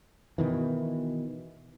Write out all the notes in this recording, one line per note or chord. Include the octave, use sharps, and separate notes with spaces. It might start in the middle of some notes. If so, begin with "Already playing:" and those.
B2 D#3 E3